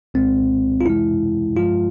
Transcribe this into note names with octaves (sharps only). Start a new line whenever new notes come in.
C2 A#2 G#3 C4
F4
F2 C3 E3 G#3 E4
G2 F3 G#3 F4